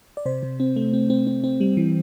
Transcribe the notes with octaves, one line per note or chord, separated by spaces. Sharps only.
D5
C3 C5
C3
C4
A3
C4
C4
C4
C4
G3
E3